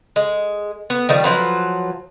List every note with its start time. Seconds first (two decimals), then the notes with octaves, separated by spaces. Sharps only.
0.16 G#3
0.90 B3
1.09 D#3 F3 G3
1.24 F3 F#3 B4